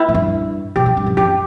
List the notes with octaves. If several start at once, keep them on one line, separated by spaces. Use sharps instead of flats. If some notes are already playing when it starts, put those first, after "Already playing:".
Already playing: E4
A#2
G2
B2 G4
E3
G2
F#2
F#2 G4